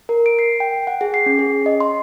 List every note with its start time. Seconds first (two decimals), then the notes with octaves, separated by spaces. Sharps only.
0.09 A#4
0.26 D7
0.39 C7
0.60 G5
0.87 F#5
1.01 G#4
1.14 C7
1.26 C#4
1.39 G#4
1.66 D#5
1.80 C6